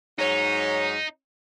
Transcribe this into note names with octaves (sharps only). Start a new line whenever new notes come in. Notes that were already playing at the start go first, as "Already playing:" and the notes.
G#2 F#3 D#4 C#5